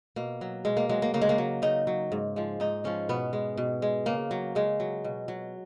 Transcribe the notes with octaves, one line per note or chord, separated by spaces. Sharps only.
B2 A#3
F#3
B2 G#3
A#3
F#3 G#3
A#3
C#3 A#3
G#3
A#3
F#3
C#3 D#4
F#3
G#2
F3 G#3
G#2 D#4
F3 G#3 C#4
B2 B3
G#3
B2
G#3
C#3 A#3
F#3
C#3 G#3
F#3
B2
F#3